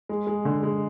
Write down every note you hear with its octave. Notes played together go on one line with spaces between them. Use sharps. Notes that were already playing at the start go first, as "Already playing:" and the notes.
G#3
G#3
D3
G#3